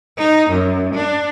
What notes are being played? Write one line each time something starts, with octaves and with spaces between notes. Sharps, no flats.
D#4
F#2
D4